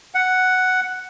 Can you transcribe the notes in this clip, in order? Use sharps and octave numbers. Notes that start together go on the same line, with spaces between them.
F#5